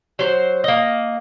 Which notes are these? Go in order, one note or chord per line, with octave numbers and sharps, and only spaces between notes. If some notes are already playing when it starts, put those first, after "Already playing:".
F#3 C5
A#3 D#5